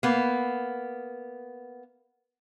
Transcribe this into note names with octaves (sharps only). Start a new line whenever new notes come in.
A#3 B3